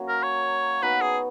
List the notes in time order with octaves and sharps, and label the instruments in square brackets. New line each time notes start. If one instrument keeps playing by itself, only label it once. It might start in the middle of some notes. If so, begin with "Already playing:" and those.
Already playing: [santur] F#3 A#3 C#4 F#4
[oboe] A#4
C#5
[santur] B3 D#4 F#4 [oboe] B4
[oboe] G#4